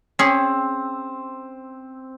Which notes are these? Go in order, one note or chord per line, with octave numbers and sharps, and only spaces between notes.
C4 C#4 G#4